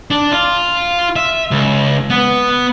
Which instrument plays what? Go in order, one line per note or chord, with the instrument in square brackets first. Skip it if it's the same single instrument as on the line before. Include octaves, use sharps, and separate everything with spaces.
[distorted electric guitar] D4
F4
E5
C#2
B3